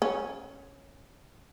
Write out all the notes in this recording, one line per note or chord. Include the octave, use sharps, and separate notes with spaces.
C#4